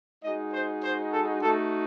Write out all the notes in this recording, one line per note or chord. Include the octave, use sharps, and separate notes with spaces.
G#3 D#4 F#4 D#5
C5
C5
A4
A3 D#4 F#4 A4